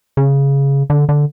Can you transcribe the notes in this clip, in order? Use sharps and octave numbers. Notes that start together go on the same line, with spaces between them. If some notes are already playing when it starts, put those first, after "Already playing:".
C#3
D3
D3